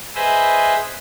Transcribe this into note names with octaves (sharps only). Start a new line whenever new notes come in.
G#4 B4 C5 D#5 E5